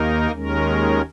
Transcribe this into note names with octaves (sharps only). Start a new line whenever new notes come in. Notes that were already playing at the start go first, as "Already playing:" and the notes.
Already playing: D#2 D#3 A#3 D#4 A#4
D#2 D#3 G#3 C#4 A#4